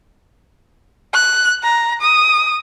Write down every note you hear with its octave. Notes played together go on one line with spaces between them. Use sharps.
F#6
A#5
D#6